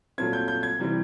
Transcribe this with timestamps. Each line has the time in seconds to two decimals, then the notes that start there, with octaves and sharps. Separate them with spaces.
0.18 A#2 F#3 A3 C4 G#6
0.33 G6
0.48 G6
0.63 G#6
0.79 C3 E3 G3 C4